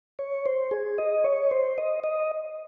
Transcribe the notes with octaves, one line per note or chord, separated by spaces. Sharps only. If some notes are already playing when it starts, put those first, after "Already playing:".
C#5
C5
G#4
D#5
C#5
C5
D#5
D#5